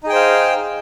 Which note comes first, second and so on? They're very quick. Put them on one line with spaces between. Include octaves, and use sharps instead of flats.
D#4 G#4 G5 C5 F5